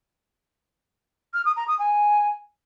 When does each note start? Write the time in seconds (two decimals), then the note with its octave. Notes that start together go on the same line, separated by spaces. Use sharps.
1.33 F6
1.45 D#6
1.56 A#5
1.67 D#6
1.78 G#5